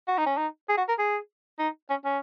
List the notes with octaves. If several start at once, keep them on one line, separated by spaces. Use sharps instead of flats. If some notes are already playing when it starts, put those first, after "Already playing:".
F#4
D#4
C#4
D#4
G#4
F#4
A#4
G#4
D#4
C#4
C#4